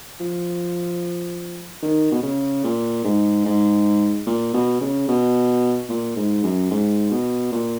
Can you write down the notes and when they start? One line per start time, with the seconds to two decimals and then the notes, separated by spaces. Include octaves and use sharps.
0.20 F3
1.83 D#3
2.12 B2
2.23 C#3
2.64 A#2
3.04 G#2
3.45 G#2
4.26 A#2
4.54 B2
4.81 C#3
5.08 B2
5.89 A#2
6.16 G#2
6.44 F#2
6.71 G#2
7.11 B2
7.52 A#2